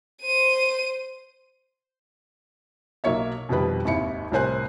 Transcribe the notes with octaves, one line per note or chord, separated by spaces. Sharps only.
C5 D#7
B1 F#3 A#3 C#5 E5
F2 B2 D#3 G3 B4
G#1 D#2 E4 C#7
C2 A2 A#4 C5 G#5 F#6